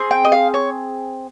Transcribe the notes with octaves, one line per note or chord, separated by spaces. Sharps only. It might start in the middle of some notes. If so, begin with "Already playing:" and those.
Already playing: C4 G#4
G5
D#5
F5
C#5